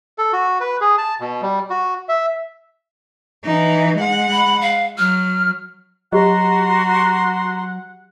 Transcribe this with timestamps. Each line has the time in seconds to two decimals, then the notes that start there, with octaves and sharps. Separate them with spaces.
0.18 A4
0.33 F#4
0.60 B4
0.81 G#4
0.98 A5
1.20 B2
1.42 G3
1.70 F#4
2.09 E5
3.45 E3 D#4
3.96 G#3 F#5
4.32 B5
4.61 F5
4.98 F#3 F6
6.13 F#3 F#4 G4 D#5 F#5 A#5 C6